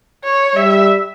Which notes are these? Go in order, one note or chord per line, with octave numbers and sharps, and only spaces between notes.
C#5
G3 E5